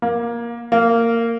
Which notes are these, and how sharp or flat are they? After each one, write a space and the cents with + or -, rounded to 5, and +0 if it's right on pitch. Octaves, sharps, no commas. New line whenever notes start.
A#3 +15
A#3 -15